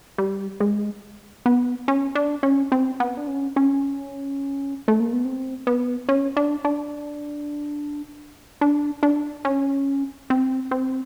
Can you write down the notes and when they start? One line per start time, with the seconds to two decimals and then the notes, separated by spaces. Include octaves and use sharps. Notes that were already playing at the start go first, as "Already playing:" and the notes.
0.18 G3
0.60 G#3
1.46 B3
1.88 C#4
2.15 D4
2.43 C#4
2.72 C4
3.00 B3
3.17 D4
3.28 C#4
3.56 C#4
4.88 A3
5.00 A#3
5.13 B3
5.25 C4
5.67 B3
6.09 C#4
6.37 D4
6.65 D4
8.61 D4
9.03 D4
9.45 C#4
10.30 C4
10.71 C4